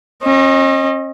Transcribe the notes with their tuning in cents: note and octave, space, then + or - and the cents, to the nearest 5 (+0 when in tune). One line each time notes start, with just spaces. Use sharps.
C#4 -45 D#5 +0